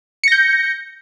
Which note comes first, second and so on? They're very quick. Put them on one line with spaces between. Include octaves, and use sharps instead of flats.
C#7 A#6 G6